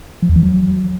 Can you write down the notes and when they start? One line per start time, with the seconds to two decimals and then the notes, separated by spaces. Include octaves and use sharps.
0.22 F3
0.29 E2
0.36 E3
0.43 F#3